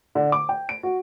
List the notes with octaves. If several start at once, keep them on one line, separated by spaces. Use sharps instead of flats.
D3
D6
G5
D7
F#4